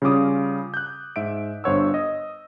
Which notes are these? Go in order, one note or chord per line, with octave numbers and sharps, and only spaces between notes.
C#3 G3 C#4 F4 D6 D#6
F#6 G6
G#2 E5 D7
G1 G2 C5 C#5 F#5 E6
D#5